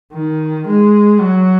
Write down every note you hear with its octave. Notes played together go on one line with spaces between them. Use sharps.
D#3
G#3
F#3